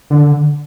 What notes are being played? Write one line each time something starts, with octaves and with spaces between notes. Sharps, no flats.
D3